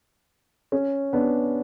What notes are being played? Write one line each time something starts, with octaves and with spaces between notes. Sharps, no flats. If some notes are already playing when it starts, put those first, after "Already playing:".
C#4
B3 D4